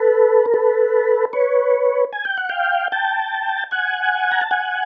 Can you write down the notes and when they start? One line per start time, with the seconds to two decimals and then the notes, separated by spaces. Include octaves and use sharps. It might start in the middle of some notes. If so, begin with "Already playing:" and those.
Already playing: A4 B4
0.46 A#4
0.54 A4 B4
1.33 B4 C#5
2.13 G#5
2.25 G5
2.37 F#5
2.49 F5 G5
2.92 G5 A5
3.71 F#5 G#5
4.32 A#5
4.41 A5
4.51 F#5 G#5